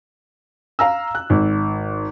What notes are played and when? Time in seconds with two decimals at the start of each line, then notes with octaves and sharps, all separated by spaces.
0.79 F5 A#5 E6
1.15 F#6
1.30 G#1